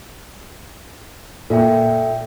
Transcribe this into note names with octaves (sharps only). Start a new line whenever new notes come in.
A#2 A#3 A4 E5 G5